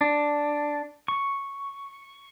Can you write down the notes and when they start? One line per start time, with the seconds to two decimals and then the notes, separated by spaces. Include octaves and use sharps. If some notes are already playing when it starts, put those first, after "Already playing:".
0.01 D4
1.08 C#6